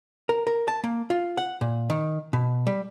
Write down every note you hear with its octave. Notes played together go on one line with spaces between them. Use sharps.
A#4
A#4
A5
A#3
F4
F#5
A#2
D#3
B2
G3